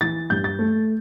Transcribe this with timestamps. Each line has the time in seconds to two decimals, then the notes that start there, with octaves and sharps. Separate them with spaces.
0.01 E3 A6
0.30 G2 G6
0.44 A6
0.59 A3